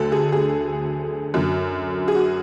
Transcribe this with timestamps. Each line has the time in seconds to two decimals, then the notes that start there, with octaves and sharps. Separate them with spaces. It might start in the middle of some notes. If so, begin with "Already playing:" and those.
Already playing: D2 D3 F#3 A4
0.12 G#4
0.32 G#4
1.34 F#2 D3 F#3
2.08 G#4
2.15 F#4